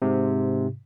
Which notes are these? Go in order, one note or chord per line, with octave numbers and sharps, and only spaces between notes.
G#2 C3